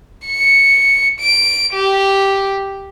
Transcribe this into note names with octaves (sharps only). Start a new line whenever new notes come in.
C#7
D7
G4